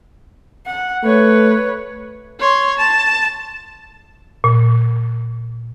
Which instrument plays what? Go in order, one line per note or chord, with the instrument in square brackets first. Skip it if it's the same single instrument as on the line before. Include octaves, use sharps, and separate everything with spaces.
[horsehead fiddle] F#5
[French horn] A3 [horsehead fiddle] B4 C#5
[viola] C#5 C6
A5
[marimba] A#2